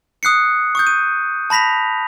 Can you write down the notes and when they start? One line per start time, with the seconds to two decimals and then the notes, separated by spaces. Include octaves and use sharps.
0.23 D#6 F#6 C7 C#7
0.75 C#6 D#6 G6
0.87 D#7
1.50 A5 B5 A#6 B6 F7